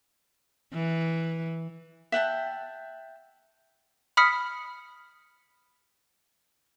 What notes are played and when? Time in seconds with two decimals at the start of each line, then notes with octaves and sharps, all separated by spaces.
0.73 E3
2.12 E5 F#5 G5 A5
4.17 B5 D#6 F6 B6 C#7